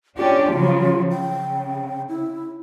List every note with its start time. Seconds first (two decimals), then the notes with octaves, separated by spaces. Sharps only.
0.17 C#4 D4 F4 G4
0.53 C#3 F3 F#3
1.11 C#3 G5
2.09 E4